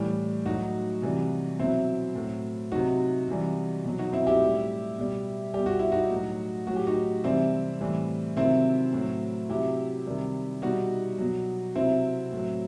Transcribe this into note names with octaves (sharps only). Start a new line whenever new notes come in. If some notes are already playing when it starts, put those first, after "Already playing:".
Already playing: A2 E3 G3
A2 F#3 D#4 F#4
C3 E3 G3
B2 F#3 C4 E4
A2 F#3
C3 F#3 D#4 F#4
C3 E3 G3
B2 F#3
D#4 F#4
C4 E4
E4 G4
A2 G3
B2 G3
B2 G3 G4
F#4
E4
D#4 F#4
A2 F#3
A2 F#3 F#4
G4
D#4 F#4
C3 E3 G3 C4 E4
A2 E3 G3
C3 D#3 F#3 C4 E4
A2 F#3
C3 F#3 E4 G4
C3 D#3 G3
B2 G3 D#4 F#4
B2 F#3
C3 F#3 C4 E4
A2 F#3